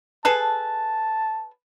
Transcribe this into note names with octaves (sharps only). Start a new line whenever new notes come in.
G#4 A4 B4 A5